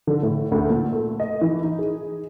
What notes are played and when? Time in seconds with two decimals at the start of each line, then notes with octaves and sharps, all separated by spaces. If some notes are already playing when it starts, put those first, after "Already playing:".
0.07 D3
0.23 A2
0.52 D2
0.70 A#2
0.92 A3
1.20 D#5
1.41 E3
1.63 D#4
1.79 G#4